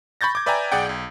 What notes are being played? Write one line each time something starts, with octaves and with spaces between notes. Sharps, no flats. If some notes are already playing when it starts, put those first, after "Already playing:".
B5 C#6 G6 A6 A#6
D6 G#6
B4 D5 E5 G5 G#5 A#5
B1 G#4 D5 F#5 G5
B1